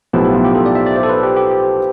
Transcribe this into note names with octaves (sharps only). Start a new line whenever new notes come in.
B1 A2 F3 B3 E4 G4
G4
F4
G4
A4
D5
E5
D5
C5
A4
B4
G4
G4